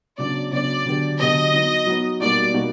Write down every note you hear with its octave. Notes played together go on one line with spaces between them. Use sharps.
C#3 F#3 B3 D4 D5
C#3 F#3 B3 D4 D5
D3 F#3 B3 D4 G4
D3 F#3 B3 D4 G4 D#5
F#3 B3 D#4
F#3 B3 D#4
B2 G3 A#3 D#4 F#4 D5
B2 G3 A#3 D#4 F#4